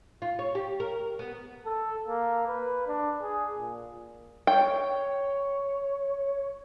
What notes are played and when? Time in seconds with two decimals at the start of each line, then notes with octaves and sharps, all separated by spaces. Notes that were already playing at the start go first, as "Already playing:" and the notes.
0.22 F4
0.39 C#5
0.55 G4
0.80 A#4
1.19 B3
1.66 A4
2.08 A#3
2.48 B4
2.87 D4
3.22 G#4
3.58 A#2
4.47 C#5 G5